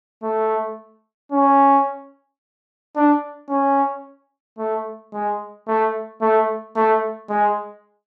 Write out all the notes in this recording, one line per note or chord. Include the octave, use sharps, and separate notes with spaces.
A3
C#4
D4
C#4
A3
G#3
A3
A3
A3
G#3